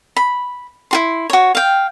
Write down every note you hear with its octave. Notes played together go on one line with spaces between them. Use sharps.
B5
E4 F#4 C6
F#4 C#5
F5 G5